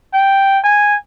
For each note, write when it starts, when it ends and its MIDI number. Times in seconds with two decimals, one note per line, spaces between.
0.14 0.59 79
0.64 0.96 80